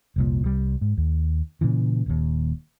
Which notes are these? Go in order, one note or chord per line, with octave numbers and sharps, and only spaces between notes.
F1 C2 A#2
C2 G3
G#2
D#2
A#2 C#3 E3
D#1 D#2